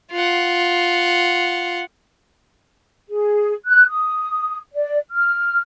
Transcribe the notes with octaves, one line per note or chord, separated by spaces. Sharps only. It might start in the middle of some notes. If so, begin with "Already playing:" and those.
F4 F#5
G#4
F#6
D#6
D5
F6